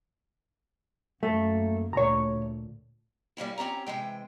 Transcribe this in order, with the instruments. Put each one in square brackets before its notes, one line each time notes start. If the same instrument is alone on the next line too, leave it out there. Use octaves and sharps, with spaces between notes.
[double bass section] F#2 A#3 [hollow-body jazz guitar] A3
[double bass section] D2 A#2 A3 [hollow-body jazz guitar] C#5 A#5
[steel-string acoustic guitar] G3 A#3 C#4 E4
C4 C#4 G4 A#5
C3 E3 G#3 G5